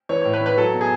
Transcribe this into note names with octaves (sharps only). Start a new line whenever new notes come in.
E3 C#5
A2 C#5
B4
E3
B4
F#3 A4
B2
G#4